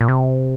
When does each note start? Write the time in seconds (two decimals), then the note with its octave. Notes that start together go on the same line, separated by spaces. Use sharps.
0.01 A#2
0.08 C3